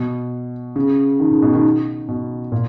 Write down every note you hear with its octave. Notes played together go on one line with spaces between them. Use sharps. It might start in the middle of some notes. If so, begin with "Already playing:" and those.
Already playing: B2
C#3
D#3
C#3
B2
D#3
B2
A#2